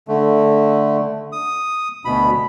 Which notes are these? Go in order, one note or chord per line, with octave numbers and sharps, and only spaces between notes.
D3 A3
D#6
D2 B2 B5